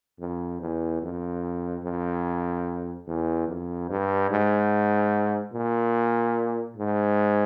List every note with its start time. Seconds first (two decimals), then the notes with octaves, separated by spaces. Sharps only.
0.20 F2
0.61 E2
1.02 F2
1.84 F2
3.07 E2
3.48 F2
3.90 G2
4.31 G#2
5.53 A#2
6.77 G#2